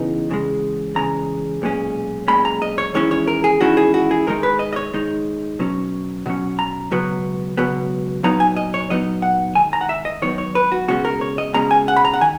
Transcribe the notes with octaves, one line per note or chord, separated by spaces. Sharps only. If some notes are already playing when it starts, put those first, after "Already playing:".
Already playing: C#3 E3 B3 D#4
E2 C#3 G#3
E2 C#3 G#3 A#5
B1 A#2 G#3 C#4
B1 A#2 G#3 C#4 B5
A#5
D#5
C#5
E2 D#3 G#3 C#4 E4 C#5
C#5
A#4
G#4
E2 D#3 G#3 C#4 E4 F#4
G#4
F#4
G#4
G#2 D#3 G#3 D#4 A#4
B4
D#5
D#5
C#5
G#2 D#3 G#3 D#4
B2 F#3 C#4
B2 F#3 C#4
A#5
C#2 B2 F#3 B3
C#2 B2 F#3 B3
A#2 F#3 B3 D#4 A#5
G#5
D#5
C#5
A#2 F#3 B3 D#4 D#5
F#5
G#2 D#3 G#5
A#5
F#5
E5
D#5
G#2 D#3 F#3 B3 C#5
C#5
B4
F#4
C#2 B2 G#3 C#4 F#4
A#4
C#5
D#5
C#2 B2 G#3 C#4 A#5
G#5
F#5
B5
A#5
F#5
D#3 G#5